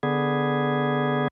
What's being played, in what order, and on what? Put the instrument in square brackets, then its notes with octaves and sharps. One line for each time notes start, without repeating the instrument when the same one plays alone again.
[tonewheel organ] D3 B3 G#4